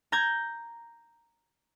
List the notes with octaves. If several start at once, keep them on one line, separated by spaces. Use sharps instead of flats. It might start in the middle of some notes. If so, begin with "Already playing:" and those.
A#5 G6 G#6